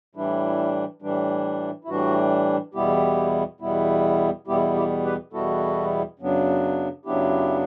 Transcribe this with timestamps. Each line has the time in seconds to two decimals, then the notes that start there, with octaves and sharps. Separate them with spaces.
0.15 A2 E3 G3 D4 E4
1.02 A2 E3 G3 D4
1.84 E4
1.88 A2 E3 G3 D4 F#4
2.74 E2 B2 G3 B3 E4 G4
3.60 E2 B2 G3 B3 E4
4.47 E2 B2 G3 B3 E4 G4
4.75 E4 G4
5.05 G4 B4
5.33 E2 B2 G3 B3 E4 F#4 A4
6.19 F#2 C#3 F#3 B3 D4
7.05 F#2 C#3 F#3 B3 D4 E4 G4